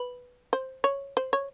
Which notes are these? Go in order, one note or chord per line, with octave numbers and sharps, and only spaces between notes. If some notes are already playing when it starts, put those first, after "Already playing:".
Already playing: B4
C5
C#5
C5
C#5